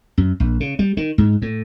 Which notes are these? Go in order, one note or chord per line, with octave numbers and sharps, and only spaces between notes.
F#2
A#1
C#3
G3
D#3
G#2
A2